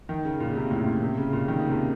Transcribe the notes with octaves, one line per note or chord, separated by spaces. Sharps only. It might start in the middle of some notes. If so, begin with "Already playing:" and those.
D#3
C#3
A#2
C#3
C3
A2
A#2
C3
C#3
A#2
D#3
C#3
C3